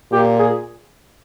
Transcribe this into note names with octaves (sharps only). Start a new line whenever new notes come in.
A#2 G4
G#4